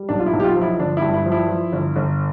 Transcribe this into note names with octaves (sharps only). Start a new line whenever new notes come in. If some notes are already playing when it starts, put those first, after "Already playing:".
Already playing: G3
B1 D4
F4
E4
B1
G4
F4
F3
E4
G1 D4
E4
G2
E4
F3
E4
F3
G1
G1